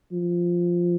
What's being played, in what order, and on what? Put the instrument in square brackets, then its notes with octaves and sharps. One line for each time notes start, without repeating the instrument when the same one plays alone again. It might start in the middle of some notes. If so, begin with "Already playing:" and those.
[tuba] F3